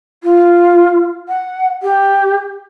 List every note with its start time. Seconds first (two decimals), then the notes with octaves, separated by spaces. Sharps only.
0.23 F4
1.29 F#5
1.83 G4